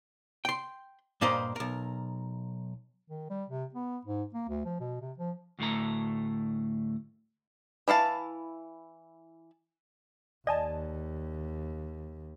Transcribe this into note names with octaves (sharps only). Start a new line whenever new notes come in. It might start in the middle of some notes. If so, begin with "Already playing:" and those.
G5 C6
G2 A#2 A#3 G4 C5 D#5
B1 A#4
D#3
G3
C3
B3
G#2
A#3
D2
F3
B2
C3
F3
D2 A2 A3 A#5
E3 E4 F5 A5
D#2 D5 D#5 G#5 A5